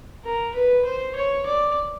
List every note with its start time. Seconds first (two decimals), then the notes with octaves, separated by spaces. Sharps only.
0.24 A#4
0.55 B4
0.85 C5
1.16 C#5
1.46 D5